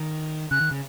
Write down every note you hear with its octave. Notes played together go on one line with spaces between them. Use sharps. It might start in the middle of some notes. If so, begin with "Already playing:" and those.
Already playing: D#3
C#3 F#6
D#3
C#3